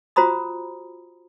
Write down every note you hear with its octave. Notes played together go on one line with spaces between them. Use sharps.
F4 F#4 C5 A#5 B5 D#6